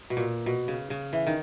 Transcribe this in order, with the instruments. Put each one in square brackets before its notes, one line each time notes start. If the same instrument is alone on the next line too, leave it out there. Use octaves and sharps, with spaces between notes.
[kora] B2
A#2
B2
C#3
C#3
E3
D#3